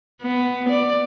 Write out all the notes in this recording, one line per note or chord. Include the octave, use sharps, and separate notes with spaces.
B3
D5